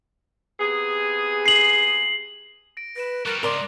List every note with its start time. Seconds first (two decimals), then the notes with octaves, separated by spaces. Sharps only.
0.60 C3 B3 G#4
1.46 C7 F#7
2.77 A#6 D7
2.96 B4 A#6 D7 E7
3.26 G3 F#4 A#4 F#6 A6 G7
3.43 G#2 C#3 A#4 D5 C6 D6